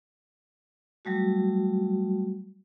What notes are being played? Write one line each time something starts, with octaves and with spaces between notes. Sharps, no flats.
F#3 G3 A3 F#4